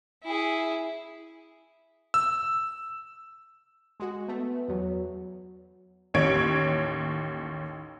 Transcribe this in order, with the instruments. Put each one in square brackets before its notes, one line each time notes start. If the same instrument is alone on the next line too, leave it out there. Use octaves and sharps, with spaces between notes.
[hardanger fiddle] E4 G#4
[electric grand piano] E6
[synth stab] G#3 F#4
[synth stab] A3 [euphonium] B3
[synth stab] E2 [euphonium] F#3
[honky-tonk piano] A1 D#2 C#5 G#6 D7